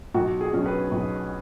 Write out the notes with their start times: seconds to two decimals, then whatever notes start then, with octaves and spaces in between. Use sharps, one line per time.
0.14 B1 F#4
0.41 G#4
0.53 B2 F#3 C#4
0.66 B4
0.92 B1